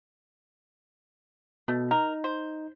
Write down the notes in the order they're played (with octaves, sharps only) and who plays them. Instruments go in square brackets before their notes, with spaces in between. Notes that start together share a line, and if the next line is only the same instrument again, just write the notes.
[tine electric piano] B2 [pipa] A3
[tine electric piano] D#4 [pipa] A#4
[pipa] C5